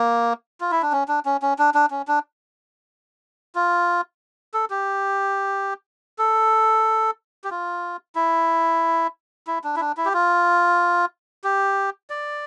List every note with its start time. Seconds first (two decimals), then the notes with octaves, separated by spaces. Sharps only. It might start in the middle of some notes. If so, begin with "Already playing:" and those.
Already playing: A#3
0.61 F4
0.71 E4
0.82 D4
0.92 C#4
1.08 D4
1.25 C#4
1.42 C#4
1.59 D4
1.74 D4
1.91 C#4
2.08 D4
3.55 F4
4.54 A4
4.70 G4
6.19 A4
7.44 G4
7.51 F4
8.15 E4
9.47 E4
9.64 D4
9.76 E4
9.81 D4
9.97 E4
10.05 G4
10.13 F4
11.44 G4
12.10 D5